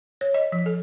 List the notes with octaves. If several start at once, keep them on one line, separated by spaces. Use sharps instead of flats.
C#5
D#5
F3
A4